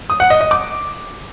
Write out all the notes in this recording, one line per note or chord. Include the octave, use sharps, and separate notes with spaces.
D#6
F#5
D#5
D#5
D6